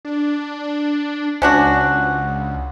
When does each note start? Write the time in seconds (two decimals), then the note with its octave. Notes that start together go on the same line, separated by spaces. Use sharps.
0.05 D4
1.42 C#2 C#4 D4 F#4